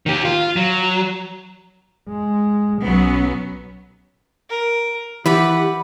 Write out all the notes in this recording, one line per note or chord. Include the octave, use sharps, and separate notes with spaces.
D#3 G4
F4
F#3
G#3
B1 F#3 B3 C#4
A#4
E3 G4 B4 D5 F#5 B5